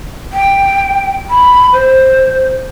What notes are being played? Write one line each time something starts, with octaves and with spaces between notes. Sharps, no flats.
G5
B5
C5